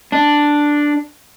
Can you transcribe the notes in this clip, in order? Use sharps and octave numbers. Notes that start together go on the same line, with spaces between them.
D4